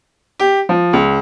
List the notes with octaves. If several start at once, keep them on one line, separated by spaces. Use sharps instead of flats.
G4
F3
C#2